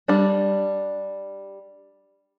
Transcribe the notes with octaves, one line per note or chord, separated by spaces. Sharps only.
G3 D4